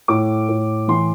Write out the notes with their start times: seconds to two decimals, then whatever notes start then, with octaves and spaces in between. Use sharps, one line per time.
0.08 A2 D6
0.49 A2
0.88 E3 C6